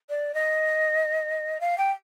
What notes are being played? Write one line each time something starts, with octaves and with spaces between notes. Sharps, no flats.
D5
D#5
F5
G5